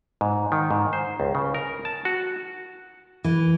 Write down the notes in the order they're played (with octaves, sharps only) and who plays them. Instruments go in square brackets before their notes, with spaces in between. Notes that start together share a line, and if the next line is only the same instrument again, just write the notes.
[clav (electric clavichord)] G#2
D#3
G#2
C5
C#2
C#3
A#4
A5
F#4
[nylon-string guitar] E3